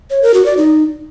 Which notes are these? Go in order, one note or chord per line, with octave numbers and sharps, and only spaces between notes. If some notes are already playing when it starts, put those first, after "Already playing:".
C#5
A#4
F#4
D5
D#4